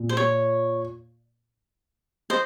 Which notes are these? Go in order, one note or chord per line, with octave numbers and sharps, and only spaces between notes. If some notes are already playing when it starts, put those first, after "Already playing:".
Already playing: A#2
C5
C#5
C5 D#5